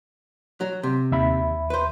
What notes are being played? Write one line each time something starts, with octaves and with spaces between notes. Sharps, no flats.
F#3
C3
D#2 E5 B5
B4 C5